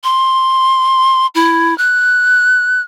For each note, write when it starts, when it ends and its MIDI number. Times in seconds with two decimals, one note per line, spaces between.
0.04 1.26 84
1.35 1.76 64
1.78 2.81 90